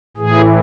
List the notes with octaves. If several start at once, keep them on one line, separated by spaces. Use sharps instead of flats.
A2 E3 G#4